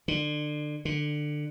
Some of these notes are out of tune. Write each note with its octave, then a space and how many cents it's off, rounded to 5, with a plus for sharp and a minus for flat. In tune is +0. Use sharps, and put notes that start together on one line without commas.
D3 +25
D3 +20